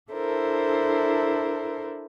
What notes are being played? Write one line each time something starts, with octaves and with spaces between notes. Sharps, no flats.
D4 E4 A4 A#4 C5